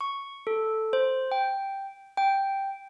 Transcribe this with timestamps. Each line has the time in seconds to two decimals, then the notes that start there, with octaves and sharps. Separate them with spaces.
0.01 C#6
0.47 A4
0.93 C5
1.32 G5
2.17 G5